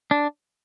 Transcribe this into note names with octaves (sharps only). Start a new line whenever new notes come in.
D4